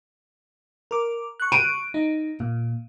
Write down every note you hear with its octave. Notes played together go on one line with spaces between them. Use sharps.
A#4 D6
C#6 F#6
D7 D#7
D#4
A#2